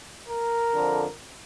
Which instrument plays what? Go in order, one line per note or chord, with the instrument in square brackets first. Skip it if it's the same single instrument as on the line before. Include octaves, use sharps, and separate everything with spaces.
[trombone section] A#4
F2 D3 F3